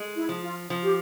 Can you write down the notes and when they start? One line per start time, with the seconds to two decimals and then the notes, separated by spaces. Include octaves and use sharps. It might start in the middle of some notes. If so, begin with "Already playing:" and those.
Already playing: G#3
0.15 E4
0.29 F3
0.43 F4
0.70 F3
0.82 G4